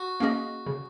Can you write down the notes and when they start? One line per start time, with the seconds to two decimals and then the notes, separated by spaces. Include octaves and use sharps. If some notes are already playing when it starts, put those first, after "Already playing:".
Already playing: F#4
0.20 A#3 C#4 G#4 D#5
0.66 C#3